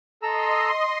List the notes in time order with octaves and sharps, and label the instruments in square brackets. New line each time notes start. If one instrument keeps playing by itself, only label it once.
[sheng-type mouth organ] A4 A#5 E6 [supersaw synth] D#5 C6